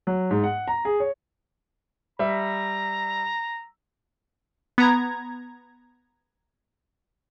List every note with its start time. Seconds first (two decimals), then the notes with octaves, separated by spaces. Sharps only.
0.07 F#3
0.31 G#2
0.44 F#5
0.68 A#5
0.85 G#4
1.00 C#5
2.19 G3 E5 A#5
4.78 B3 A#5 G#6